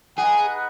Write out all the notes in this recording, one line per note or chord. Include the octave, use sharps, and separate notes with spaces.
D#4 G#4 B4 D#5 F#5